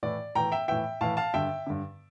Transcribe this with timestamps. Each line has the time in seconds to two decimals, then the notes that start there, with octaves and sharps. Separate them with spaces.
0.03 A2 E3 D5
0.35 A2 E3 G5 A#5
0.52 E5 G5
0.68 A2 E3 E5 G5
1.01 A2 E3 F5 A5
1.17 F5 A5
1.34 G2 D3 E5 G5
1.66 G2 D3